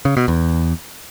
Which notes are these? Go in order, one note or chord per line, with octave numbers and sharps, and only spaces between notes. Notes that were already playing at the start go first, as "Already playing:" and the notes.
C#3
B2
E2